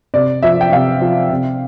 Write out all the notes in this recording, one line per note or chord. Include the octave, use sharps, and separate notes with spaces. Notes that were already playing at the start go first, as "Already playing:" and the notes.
C3 D5
F3 E5
G5
C3 F5
F3
C3